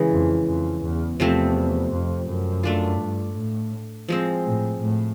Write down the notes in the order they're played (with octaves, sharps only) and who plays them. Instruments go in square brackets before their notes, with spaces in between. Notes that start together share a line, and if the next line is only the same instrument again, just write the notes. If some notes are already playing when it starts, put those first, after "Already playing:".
Already playing: [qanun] C#3 E3 G#3
[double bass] F2
F2
E2
[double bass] E2 [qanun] C3 F3 A3 C4
[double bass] F2
F#2
[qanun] A3 D4 F4
[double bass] G2
A2
[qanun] F3 G#3 C4
[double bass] A2
A2